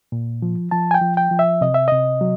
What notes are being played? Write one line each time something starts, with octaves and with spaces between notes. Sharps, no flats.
A#2
F3
F3 A5
G#5
G5
F3
G5
F3
E5
C3 D#5
E5
C3 D#5
F#3